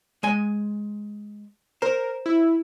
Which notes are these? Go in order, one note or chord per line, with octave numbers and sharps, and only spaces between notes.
G#3 G#5
A#4 C5
E4